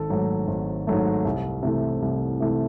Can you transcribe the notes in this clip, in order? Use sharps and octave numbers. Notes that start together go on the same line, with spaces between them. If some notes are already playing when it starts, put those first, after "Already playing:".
Already playing: G#1 A4
G#2 F#3 A3
G#1
G#2 F#3 A3
C2
C3 E3 A3
C2
C3 E3 A3